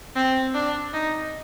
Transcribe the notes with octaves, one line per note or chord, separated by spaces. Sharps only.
C4
D4
D#4